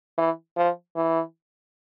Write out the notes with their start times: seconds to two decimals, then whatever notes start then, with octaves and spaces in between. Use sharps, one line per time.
0.18 E3
0.57 F3
0.96 E3